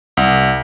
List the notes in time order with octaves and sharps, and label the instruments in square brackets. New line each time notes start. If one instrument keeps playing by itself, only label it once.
[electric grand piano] C2